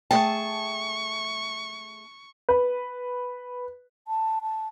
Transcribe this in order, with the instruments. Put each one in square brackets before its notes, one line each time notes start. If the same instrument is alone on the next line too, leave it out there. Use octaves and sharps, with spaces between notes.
[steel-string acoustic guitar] A3 G#4 A5 [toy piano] G5 [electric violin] C#6
[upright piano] B4
[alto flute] A5
A5